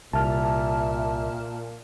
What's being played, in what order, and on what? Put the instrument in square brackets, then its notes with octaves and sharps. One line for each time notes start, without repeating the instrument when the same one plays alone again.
[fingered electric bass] C2 [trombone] A#2 [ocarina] E5 [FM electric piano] A5 F6